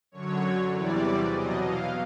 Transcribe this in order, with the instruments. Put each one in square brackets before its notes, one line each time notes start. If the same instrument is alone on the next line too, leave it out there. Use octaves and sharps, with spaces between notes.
[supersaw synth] F#2 D3 F#3 C#5
E2 C3 E3 G3 D5
B2 F#3 D#5
F5